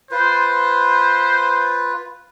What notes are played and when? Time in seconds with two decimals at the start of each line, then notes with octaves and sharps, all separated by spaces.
0.11 F4 B4 C5